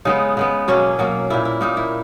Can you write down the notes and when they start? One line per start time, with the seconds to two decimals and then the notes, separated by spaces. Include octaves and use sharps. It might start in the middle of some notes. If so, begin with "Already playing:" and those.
0.05 C#3 G#3 B3 D#4
0.37 C#3 G#3 B3
0.68 B2 F#3 A#3 C#4
0.99 B2 F#3 A#3
1.30 A#2 A#3 E4
1.45 E4
1.61 A#2 A#3 D#4
1.77 E4